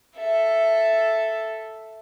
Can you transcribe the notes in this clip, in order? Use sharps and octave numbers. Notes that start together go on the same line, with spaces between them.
A4 E5